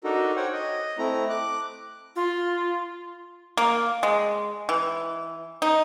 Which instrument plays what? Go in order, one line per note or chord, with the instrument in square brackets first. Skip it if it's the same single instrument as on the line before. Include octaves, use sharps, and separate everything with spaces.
[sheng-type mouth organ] D4 D#4 F#4 A4 A#4
C5 C#5 F#5 G5
D#5
A3 C4 E4 A#5
D6 F#6
[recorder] F4
[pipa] A#3
G#3
E3
D#4